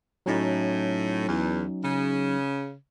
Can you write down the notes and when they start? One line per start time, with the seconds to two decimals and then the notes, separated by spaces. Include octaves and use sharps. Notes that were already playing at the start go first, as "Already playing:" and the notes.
0.26 A2 F#3 C#4 D#4
1.27 E2
1.82 C#3